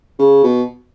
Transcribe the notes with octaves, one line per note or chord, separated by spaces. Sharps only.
C#3
B2